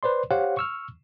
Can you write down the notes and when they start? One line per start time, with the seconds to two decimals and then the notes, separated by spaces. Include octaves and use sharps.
0.03 B4 C5 D5 C6
0.31 G4 C5 C#5 F5 F#5
0.57 C#6 E6 F6